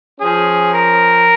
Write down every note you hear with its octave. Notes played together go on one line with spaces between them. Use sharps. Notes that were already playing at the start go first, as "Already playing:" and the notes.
F3 C#4 G#4
A#4